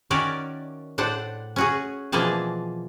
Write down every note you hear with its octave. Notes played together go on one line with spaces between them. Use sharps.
D#3 C#4 F#4 A#4 D5 E5
A2 D4 C5 F#5
C#4 F#4 G#4
B2 E3 F3 A#3 G#4 A5